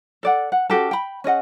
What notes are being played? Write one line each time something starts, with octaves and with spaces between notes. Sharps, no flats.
A4 D5 F#5
F#5
C#4 F#4 G4 A4
G5 B5
C#4 G#4 D#5 F#5